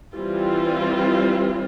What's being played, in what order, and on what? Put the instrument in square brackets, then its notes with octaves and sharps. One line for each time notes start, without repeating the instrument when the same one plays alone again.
[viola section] E3 G3 C4 F4